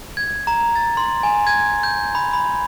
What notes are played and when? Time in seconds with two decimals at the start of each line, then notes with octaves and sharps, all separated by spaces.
0.17 G#6
0.47 A#5
0.76 A6
0.97 C6
1.23 G#5
1.47 G#6
1.83 G6
2.15 B5
2.33 B5